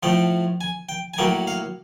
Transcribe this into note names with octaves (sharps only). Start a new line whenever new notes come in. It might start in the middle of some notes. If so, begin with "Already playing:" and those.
A2 F3 A3 G5
G#5
G5
G#5
A2 F#3 A#3 G5
F5